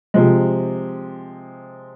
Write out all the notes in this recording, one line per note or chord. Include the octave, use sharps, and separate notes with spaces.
C3 F3 G#3